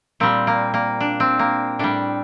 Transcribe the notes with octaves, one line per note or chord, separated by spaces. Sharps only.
A#2 G3 C4
A#3
A#3
D4
C4
A#3
A2 G3 D4